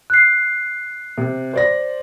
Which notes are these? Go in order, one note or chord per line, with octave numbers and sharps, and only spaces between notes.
F#6 C7
C3
C5 D5 A#6